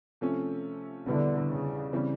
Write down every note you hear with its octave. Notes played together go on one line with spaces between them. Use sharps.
C3 F3 A3 C#4
E2 B2 D3 G3 B3 E4
C#3
C#3 E3 G3 C4